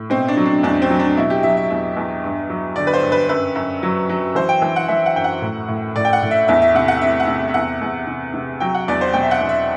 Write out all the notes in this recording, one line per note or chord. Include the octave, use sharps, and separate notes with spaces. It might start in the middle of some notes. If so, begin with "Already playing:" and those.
Already playing: A2
B2 C4
D4
F#3
D4
E2 D4
C4
F#3
D4
B2 E4
G4
F#3 E5
E5
E2 E5
E2
G2
F#3
D3 D5
B4
C5
G2
B4
F#2 B4
F#2
F#3
F#3
E3 C5
G5
E3
F#5
E3 E5
F#5
F#2 G5
F#5
A2
A2
A2 D5
G5
F#5
A2
E5
E2 E5
E5
C3 F#5
F#5
C3 E5
F#5
C3
E5
E2 F#5
E2
C3
C3
F#3 G5
F#5
E2 D5
C5
B2 G5
E5
F#5
E2
E5